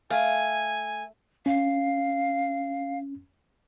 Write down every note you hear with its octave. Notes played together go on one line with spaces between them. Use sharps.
A3 F5 G#5
C#4 F5